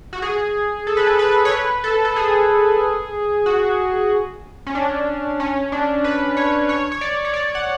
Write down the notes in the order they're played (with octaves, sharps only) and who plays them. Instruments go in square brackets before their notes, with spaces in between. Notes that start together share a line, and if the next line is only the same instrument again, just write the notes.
[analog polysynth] F#4
G#4
A4
B4
A4
B4
C#5
B4
A4
A4
G#4
F#4
C#4
D4
C#4
D4
B4
C#5
C#5
C#5
D5
C#5
D5
F#5